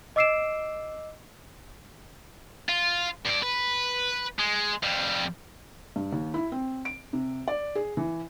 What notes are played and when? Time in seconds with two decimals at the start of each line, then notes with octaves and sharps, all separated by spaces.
0.16 D#5 D6 E6 C7 D7 E7
2.69 F4
3.26 G2 D5
3.43 B4
4.39 G#3
4.83 F2 G3
5.96 G2
6.12 D#2
6.34 E4
6.52 C4
6.85 D7
7.13 C3
7.48 D5
7.75 G#4
7.97 E3